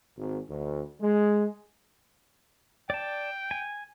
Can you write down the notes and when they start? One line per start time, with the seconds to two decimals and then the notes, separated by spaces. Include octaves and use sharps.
0.17 G#1
0.48 D2
1.01 G#3
2.90 D5 G5 A5
3.51 G#5